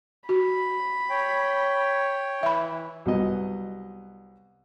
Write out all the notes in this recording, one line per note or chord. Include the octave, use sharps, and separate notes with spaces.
F#4 B5
C#5 G5
E3 E5 B5
C2 F#3 B3 D#5